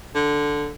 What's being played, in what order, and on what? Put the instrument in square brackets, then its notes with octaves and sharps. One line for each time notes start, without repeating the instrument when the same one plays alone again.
[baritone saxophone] D3